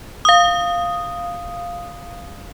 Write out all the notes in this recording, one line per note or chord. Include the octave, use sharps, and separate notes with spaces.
F5 D#6